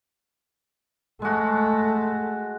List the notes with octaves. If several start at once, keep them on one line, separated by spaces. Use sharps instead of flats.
G#3 A3 F#4